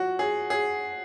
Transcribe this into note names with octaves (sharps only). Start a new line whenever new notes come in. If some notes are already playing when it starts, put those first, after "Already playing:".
Already playing: F3 F#4
G#4
G#4